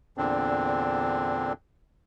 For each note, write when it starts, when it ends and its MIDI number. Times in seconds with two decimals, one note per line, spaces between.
0.17 1.53 40
0.17 1.53 46
0.17 1.53 50
0.17 1.53 60
0.17 1.53 62